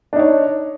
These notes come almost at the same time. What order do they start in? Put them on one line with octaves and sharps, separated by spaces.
D4 D#4 C#5